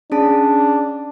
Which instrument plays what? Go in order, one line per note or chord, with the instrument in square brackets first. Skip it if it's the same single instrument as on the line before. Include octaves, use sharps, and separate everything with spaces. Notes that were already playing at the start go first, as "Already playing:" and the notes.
[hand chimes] C#4 G#4 A5 [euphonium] D4